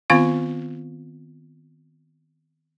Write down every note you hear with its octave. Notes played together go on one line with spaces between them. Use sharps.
D#3 B3 C4 F4 F5 C#6